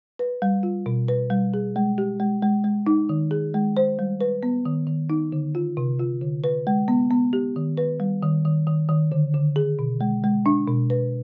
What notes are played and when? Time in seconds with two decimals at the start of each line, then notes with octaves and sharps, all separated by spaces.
0.19 B4
0.42 G3
0.63 F4
0.86 B2
1.08 B4
1.30 G3
1.54 G#4
1.76 G#3
1.98 G4
2.20 G#3
2.42 G#3
2.64 G#3
2.87 D#4
3.09 D#3
3.31 G#4
3.54 G#3
3.77 C5
3.99 G3
4.21 B4
4.43 B3
4.66 D#3
4.87 D#3
5.10 D#4
5.32 D3
5.55 F4
5.77 C3
6.00 F4
6.22 D3
6.44 B4
6.67 G#3
6.88 B3
7.11 B3
7.33 G4
7.56 D#3
7.77 B4
8.00 G3
8.23 D#3
8.45 D#3
8.67 D#3
8.89 D#3
9.12 D3
9.34 D3
9.56 G#4
9.79 B2
10.01 G#3
10.24 G#3
10.46 D4
10.68 B2
10.90 B4